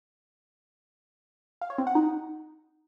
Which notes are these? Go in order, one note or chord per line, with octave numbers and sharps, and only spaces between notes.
F5
C#5
C4
F#5
D#4